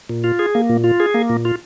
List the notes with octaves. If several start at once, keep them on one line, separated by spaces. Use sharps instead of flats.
A#2
F4
G#4
A#3
A#2
F4
G#4
A#3
A#2
F4